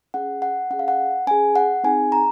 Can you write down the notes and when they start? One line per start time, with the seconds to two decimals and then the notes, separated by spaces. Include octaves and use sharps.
0.14 C#4 G#4 F#5
0.42 F#5
0.71 C#4 G#4 F#5
0.79 F5
0.88 F#5
1.27 C#4 G#4 G#5
1.56 F#5
1.84 C4 D#4 G#4 G#5
2.12 A#5